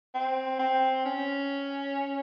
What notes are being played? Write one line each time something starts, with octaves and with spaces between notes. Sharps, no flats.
C4
C4
C#4